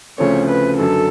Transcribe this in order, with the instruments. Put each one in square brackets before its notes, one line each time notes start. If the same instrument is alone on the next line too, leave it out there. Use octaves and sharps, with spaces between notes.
[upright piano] D2 C#3 F3 A3 C4 [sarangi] C#5
[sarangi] B4
[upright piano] F#2 D3 F#3 [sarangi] A4